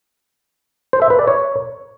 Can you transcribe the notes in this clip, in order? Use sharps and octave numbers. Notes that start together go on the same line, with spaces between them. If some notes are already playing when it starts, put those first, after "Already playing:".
C5
E5
B4
D5
C#5